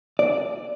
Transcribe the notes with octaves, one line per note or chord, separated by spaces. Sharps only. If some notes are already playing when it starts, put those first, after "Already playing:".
D5